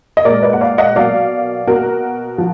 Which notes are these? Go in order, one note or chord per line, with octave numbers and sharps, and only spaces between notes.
D#5
A#2 G#3 A#4 D5
B4 D#5
F#5
D5 F5
D#5 F#5
B2 F#3 A#3 D5 F5
B2 A#3 F#4 A#4
F3